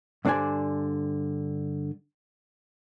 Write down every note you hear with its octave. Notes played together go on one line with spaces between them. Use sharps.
G2 D3 D4 C5 D5 G#5